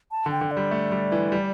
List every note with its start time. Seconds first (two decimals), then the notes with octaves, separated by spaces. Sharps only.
0.11 A5
0.26 D3
0.31 G5
0.41 D3
0.51 D5
0.57 G3
0.71 A3
0.92 G3
1.12 E3
1.32 G3